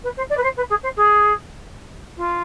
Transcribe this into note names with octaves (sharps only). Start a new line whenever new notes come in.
B4
C5
D5
B4
C5
B4
G#4
C5
G#4
F4